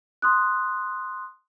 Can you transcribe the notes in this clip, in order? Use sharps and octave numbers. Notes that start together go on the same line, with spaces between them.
C6 D#6 F#6